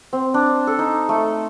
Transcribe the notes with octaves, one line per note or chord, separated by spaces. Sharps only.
C4
D4
A4
D#4
A3